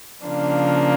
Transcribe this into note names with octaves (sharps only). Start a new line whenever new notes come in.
C#3 F3 A#3 D4